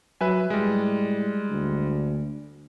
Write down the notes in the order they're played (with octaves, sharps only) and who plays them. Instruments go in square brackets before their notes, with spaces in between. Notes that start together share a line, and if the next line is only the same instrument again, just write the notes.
[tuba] F#3 [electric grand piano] B4 E5 G#5
[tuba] A2 [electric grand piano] G3 G#3
[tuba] D2